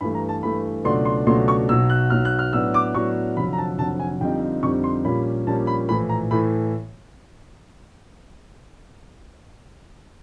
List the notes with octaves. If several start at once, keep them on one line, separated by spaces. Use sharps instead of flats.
G2 E3 A3 B5
A#5
A5
G2 E3 A3 B5
C#2 B2 F#3 A3 D4 C6
C6
C#2 B2 F#3 A3 D4 C6
C#6
B1 B2 F#3 E6
F#6
B1 B2 F#3 F6
F#6
F6
A2 F#3 B3 D4 E6
D6
A2 F#3 B3 D4 C#6
F1 F2 D3 F#3 B5
A#5
A5
F1 F2 D3 F#3 A5
G#5
F2 D3 G3 C4 D#4 G5
F2 D3 G3 C4 D#4 C#6
C6
A#1 A#2 G3 A#3 C#4 B5
A#1 A#2 G3 A#3 C#4 A5
B5
A#1 A2 E3 A3 B5
A#5
A2 E3 A3 B5